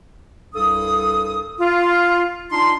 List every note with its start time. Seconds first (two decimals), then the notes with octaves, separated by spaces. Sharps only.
0.54 C2 G2 A4 D#6
1.60 F4
2.52 D4 D#4 F4 A5 C6